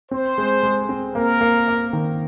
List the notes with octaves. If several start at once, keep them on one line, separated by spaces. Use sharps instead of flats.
C4 C5
G#3
G#3
C4
A#3 A#4
A#3
A#3
D#3